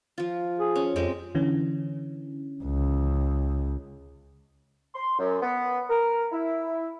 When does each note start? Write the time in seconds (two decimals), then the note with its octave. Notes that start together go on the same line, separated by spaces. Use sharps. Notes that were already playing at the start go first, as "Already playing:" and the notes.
0.18 F3 F4
0.59 G#4
0.76 C#4
0.96 F2 G#3 C4 G4
1.35 D3 E3 C#4
2.64 C#2
4.95 C6
5.19 F#2
5.41 B3
5.89 A#4
6.32 E4